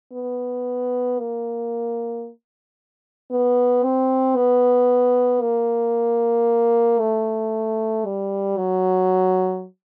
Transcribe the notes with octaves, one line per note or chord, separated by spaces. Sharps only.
B3
A#3
B3
C4
B3
A#3
A3
G3
F#3